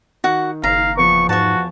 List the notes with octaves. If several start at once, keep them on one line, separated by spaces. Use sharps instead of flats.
D#3 F#4 F#5
F#1 F5 A#5
E2 F3 B3 C#6
G#2 F#4 A5 C#6